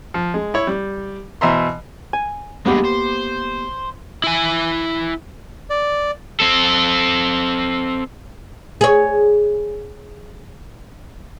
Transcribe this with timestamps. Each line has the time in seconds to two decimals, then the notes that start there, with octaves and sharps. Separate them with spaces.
0.14 F3
0.34 G#3
0.54 E4 C#5
0.67 G3
1.41 B2 E3 C5 E5 A#5 C6
2.13 G#5
2.66 G2 G#3 A#3 B3 G4
2.85 C5
4.24 E4 G#5
5.70 D5
6.40 C4 A4
8.81 G#4 C#5